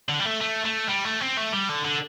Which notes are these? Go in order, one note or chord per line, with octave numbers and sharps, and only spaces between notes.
D3
G3
A3
A3
A3
G3
A3
C4
A3
G3
D3
D3